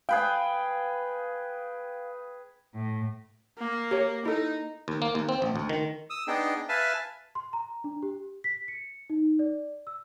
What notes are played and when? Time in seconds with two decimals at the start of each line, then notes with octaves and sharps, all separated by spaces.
0.09 G#4 B4 F5 G5
2.75 A2
3.58 A#3
3.91 G4 A#4 C#5
4.26 D#4 E4 A4
4.88 D#2
5.02 A#3
5.15 D#2
5.29 C4
5.42 A1
5.56 D2
5.69 D#3
6.10 D#6 E6
6.27 B3 D4 D#4 G#4 G5
6.69 B4 E5 F5 G#5 A5
7.35 C6
7.53 A#5
7.84 D4
8.03 G4
8.44 B6
8.68 C#7
9.10 D#4
9.39 D5
9.87 E6